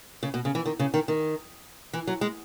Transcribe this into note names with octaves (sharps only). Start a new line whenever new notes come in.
C#3
B2
C#3
E3
D#3
C#3
D#3
D#3
E3
F#3
G#3